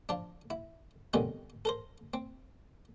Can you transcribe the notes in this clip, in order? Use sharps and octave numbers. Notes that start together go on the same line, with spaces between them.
F3 D4
E4
B2 D3 D#3 G3 C4 C#4
A4 A#4 C5
C4